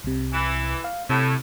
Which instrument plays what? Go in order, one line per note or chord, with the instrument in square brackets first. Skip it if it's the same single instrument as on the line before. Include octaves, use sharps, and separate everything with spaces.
[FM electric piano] C2 C3
[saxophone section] E3
[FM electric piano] F5
[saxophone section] A2 [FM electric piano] C3